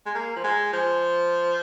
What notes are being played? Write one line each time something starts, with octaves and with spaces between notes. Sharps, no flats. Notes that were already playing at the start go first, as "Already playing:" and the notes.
G#3
A#3
F3
G#3
F3